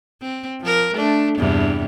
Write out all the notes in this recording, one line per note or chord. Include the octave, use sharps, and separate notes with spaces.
C4
F3 A#4
A3 D4
E2 G2 C3